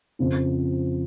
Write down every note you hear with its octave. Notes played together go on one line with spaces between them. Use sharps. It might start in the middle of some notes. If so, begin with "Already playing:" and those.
F2 C#3 F3 C4 F4